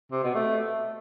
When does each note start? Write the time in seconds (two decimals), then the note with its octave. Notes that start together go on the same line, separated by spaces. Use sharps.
0.12 C3
0.23 B2
0.35 A3